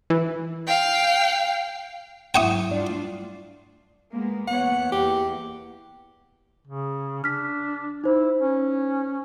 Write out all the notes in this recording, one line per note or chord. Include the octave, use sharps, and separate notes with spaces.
E3
F5 G5
G#2 F#3 E4 E5 F#5 G5 C#6 D#6
G2 D4 F4 D5
G#3 A#3 B3
E2 B3 C#5 F#5
E2 A#3 G4
C#3
D4 F6 B6
D#4 E4 C5
C#4